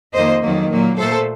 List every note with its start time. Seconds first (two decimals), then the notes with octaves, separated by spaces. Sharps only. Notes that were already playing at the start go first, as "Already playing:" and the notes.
0.13 F2 D#3 A#3 C5 D#5
0.42 F2 D#3 F#3 A#3
0.70 A#2 F#3 A#3
0.98 A#2 A3 A4 C5